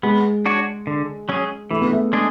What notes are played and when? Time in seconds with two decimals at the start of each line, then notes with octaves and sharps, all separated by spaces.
0.03 G#3 B3
0.46 D4 F#4 C#5
0.87 D3
1.29 F#3 C#4 G#4
1.71 E3 A3
1.81 B3
1.93 A3
2.13 G#3 D4 G#4